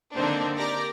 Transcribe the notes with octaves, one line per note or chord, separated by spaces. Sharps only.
D3 A#3 C4 D4 D#4
G4 A#4 D5 D6 A#6